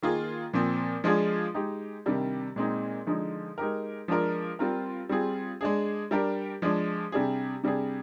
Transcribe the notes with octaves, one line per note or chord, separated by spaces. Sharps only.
D#3 A#3 F4 G#4
A#2 F3 C4
F3 G#3 D4 F4 G#4
G#3 D#4 G4
C3 D#3 G3 D4
A#2 G#3 C4 D#4
D3 F3 G#3 D#4
G#3 D#4 G4 A#4
F3 G#3 D4 F4 A#4
G3 C4 F4 A#4
G3 C4 F4 G#4
G#3 D4 G#4
G3 D4 G4 A#4
F3 G#3 D4
C3 G3 D4 G#4
C3 G3 D4 G#4